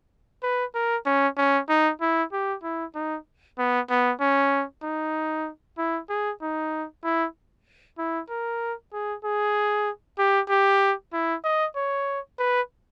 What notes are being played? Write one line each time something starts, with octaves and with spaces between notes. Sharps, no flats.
B4
A#4
C#4
C#4
D#4
E4
G4
E4
D#4
B3
B3
C#4
D#4
E4
G#4
D#4
E4
E4
A#4
G#4
G#4
G4
G4
E4
D#5
C#5
B4